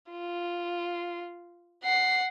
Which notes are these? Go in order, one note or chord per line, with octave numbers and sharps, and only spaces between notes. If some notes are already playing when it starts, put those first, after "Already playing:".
F4
F#5 C7